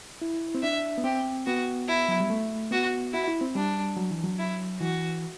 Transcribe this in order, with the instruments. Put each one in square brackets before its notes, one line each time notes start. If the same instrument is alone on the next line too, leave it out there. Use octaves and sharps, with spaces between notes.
[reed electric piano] E4
C4
[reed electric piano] D4 [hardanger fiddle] E5
[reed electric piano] B3
[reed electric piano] C4 [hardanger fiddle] G4
[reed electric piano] B3 [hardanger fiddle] F#4
[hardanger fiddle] E4
[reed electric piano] F#3
G3
A3
[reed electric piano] B3 [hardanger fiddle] F#4
[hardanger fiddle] E4 [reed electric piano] F#4
[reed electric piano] E4
C4
[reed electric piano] G3 [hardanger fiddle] D4
[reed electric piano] F#3
E3
F#3
[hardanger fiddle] E4
[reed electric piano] E3 [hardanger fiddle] F#4